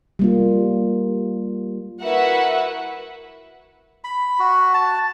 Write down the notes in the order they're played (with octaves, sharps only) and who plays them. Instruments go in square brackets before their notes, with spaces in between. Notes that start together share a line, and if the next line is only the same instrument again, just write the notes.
[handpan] G3 A#3 F4
[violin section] E4 F#4 A#4 B4 E5 F#5
[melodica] B5
F#4
A5